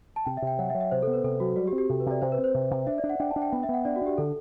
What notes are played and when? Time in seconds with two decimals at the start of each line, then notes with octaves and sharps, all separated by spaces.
0.16 A5
0.25 C3 G5
0.37 E5
0.42 C3
0.47 G5
0.59 F#3 F#5
0.70 E5
0.75 F#3
0.81 E5
0.91 C3 C5
1.03 B3 A4
1.13 B4
1.24 C3 A4
1.40 F#3 F#4
1.56 G3 F#4
1.67 G4
1.73 C4
1.78 G4
1.89 C3 A4
2.00 B4
2.06 C3 D5
2.21 C3 C5
2.32 B4
2.38 C4
2.44 C5
2.54 C3
2.71 C3
2.87 D4 E5
2.98 D5
3.04 D4
3.09 F#5
3.20 D4 G5
3.31 A5
3.36 D4
3.42 G5
3.53 B3 G5
3.63 E5
3.69 B3 F#5
3.85 D4 D5
3.96 F#4
4.01 D4 G4
4.18 D3 A4